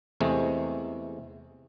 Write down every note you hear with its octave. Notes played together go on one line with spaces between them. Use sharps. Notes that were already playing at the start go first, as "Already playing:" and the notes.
E2 C3 G#3 A3